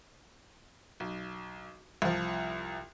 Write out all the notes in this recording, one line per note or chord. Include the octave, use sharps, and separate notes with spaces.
B1
C2 F3